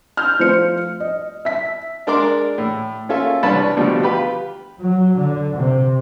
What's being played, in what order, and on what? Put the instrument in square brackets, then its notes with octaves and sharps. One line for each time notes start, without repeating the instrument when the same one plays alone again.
[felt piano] F6 G6
F3 A3 C5 C#7
D#5
E5 B6
[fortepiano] G#3 D4 A#4 D5 C6 D6
A2
A#3 C#4 F4 A4 E5
C2 D4 B4 C#5 A5 B5
B2 D3 F3 G3 A3
F4 G4 B4
[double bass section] F#3
D3
C3